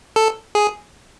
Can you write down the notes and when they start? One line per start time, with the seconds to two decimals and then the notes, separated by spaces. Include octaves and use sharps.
0.16 A4
0.55 G#4